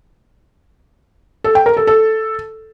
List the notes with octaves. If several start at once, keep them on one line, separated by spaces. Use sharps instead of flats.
A4
G5
A#4
A4
A4